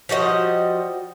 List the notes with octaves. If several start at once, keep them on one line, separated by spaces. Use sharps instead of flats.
F3 G3 F#4 D#5